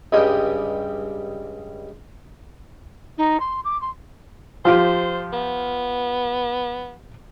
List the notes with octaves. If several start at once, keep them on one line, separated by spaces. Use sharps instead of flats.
C#2 G2 G3 G#3 D#5 G5
D#4
C6
D6
C6
F3 F4 G4 C5
B3